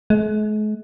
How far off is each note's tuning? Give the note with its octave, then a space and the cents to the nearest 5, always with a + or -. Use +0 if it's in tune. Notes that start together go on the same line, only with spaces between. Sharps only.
G#3 +45